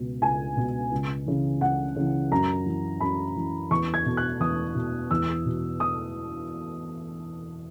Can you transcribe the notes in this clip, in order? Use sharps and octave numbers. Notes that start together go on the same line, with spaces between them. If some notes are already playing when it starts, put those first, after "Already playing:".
Already playing: C#2 B2
C#2 G#5
B2
C#2
C#3 E3
C#2 F#5
C#3 E3
F#2 A#5
E3
F#2 B5
E3
E2 C#6
G#6
B2
F#6
E2 D#6
B2
E2 E6
B2
D#6